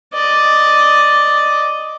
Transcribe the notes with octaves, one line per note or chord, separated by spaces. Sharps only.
D5 D#5